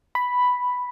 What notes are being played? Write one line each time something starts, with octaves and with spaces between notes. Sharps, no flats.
B5